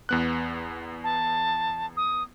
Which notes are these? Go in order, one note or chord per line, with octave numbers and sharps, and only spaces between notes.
E2 B3 F#6
A5
D#6